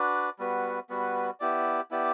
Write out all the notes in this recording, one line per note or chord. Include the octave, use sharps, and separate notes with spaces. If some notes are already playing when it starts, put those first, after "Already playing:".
Already playing: D4 F#4 B4 D5
G3 B3 F#4 B4
G3 B3 F#4 B4
B3 E4 G4 D5
B3 E4 G4 D5